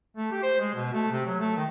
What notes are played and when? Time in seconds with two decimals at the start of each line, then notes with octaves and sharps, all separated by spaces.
0.17 A3
0.32 G4
0.43 C5
0.60 G#3
0.75 B2
0.93 A3
1.11 C3
1.26 F#3
1.40 A3
1.57 D#3